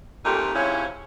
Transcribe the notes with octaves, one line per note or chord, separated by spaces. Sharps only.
F2 A#2 A3 D#4 G4
G#2 C3 F3 C#4 E4 C#5